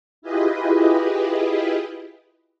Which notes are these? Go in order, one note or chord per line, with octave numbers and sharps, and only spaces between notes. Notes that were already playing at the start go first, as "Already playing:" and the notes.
E4 F4 G4 G#4 B4 D#5